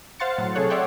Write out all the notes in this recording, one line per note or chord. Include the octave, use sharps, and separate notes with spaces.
C5 F5 F#5 C6 A6 C#7
A2 F#3
C3 G#4 A4 C#5 F#6
C#5 D5 E5 F#5 G5 C6